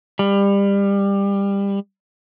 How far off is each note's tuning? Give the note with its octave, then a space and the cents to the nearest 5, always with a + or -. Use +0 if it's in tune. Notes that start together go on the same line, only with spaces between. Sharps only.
G3 +25